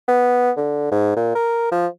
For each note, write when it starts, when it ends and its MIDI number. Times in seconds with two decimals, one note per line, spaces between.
0.08 0.51 59
0.57 0.91 50
0.92 1.15 44
1.17 1.32 46
1.35 1.67 70
1.72 1.87 53